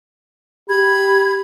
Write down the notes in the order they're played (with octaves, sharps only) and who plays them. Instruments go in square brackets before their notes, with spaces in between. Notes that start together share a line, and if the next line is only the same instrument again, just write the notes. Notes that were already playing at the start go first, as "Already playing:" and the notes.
[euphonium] G4 [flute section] B5 G#6